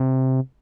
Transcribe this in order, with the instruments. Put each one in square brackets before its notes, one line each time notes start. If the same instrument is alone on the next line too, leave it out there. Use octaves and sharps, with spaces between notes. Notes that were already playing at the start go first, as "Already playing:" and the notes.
Already playing: [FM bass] C3